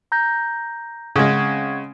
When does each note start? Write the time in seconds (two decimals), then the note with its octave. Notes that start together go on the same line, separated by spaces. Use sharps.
0.12 A#5 G6 A#6
1.16 C#3 G#3 C4 F#5 G#6